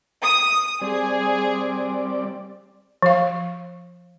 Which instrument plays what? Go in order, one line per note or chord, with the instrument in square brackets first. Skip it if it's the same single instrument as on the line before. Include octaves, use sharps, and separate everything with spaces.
[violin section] D#6
[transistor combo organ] G3 C4 D5 [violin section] G#4
[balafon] F3 F5